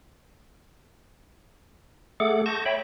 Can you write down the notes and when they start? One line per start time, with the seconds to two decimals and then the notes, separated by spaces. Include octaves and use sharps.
2.20 A3 G#4 A4 F#5 D6
2.46 A5 C#6 G6 A#6
2.66 C#5 E5 G5 B5